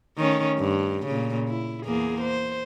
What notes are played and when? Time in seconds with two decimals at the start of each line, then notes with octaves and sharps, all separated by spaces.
0.17 D#3 A3 C#4
0.59 G2
1.06 A#2 C#3
1.48 E4
1.85 E2 A#3 G#4
2.21 C5